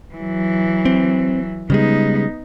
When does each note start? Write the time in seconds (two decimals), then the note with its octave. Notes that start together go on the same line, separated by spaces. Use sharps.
0.14 E3 F#3
0.85 C4
1.70 C#3 G3 G#3 B3 D#4